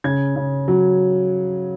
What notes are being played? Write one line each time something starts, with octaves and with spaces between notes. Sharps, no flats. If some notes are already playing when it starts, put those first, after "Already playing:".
C#3 G#6
C#3
F#3